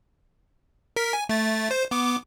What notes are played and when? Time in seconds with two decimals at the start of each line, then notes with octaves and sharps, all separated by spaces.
0.96 A#4 B6
1.13 G#5
1.29 A3 A6
1.71 C5
1.91 B3 D6